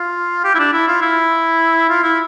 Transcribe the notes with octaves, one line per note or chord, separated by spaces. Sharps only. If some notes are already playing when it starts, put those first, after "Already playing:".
Already playing: F4
G4
E4
D4
E4
F4
E4
F4
E4